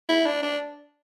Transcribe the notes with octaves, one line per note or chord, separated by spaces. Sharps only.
E4
D4
D4